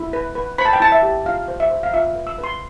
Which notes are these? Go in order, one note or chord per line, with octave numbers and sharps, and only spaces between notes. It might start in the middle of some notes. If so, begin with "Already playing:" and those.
Already playing: E4
B4
B4
C5 B5
A5
G5
E4 A5
E5
G4
F4 F5
C5
E5
C5
F5
F4 E5
B4
E6
B4
C6